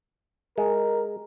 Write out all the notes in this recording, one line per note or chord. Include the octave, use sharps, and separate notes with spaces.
G#3 A#4